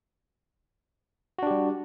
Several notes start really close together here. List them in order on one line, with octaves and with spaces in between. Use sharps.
F#4 D4 G4 G3